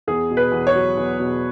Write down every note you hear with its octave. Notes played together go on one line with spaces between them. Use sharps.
E2 G#4
B2
B4
E2
C#5
F#3
E2
B2